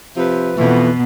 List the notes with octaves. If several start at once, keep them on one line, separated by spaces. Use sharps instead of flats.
C3 F3 B4
F2 B2 E3 B3